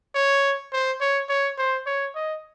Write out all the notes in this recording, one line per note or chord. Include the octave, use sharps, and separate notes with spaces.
C#5
C5
C#5
C#5
C5
C#5
D#5